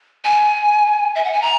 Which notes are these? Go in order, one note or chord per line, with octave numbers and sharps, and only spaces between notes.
G#5
E5
F#5
G#5
A#5